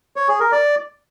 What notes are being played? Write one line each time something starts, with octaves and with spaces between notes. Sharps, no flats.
C#5
G#4
A#4
D5